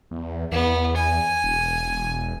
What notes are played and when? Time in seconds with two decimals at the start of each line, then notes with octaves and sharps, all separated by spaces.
0.11 E2
0.52 E2 B3
0.96 G#5
1.44 E1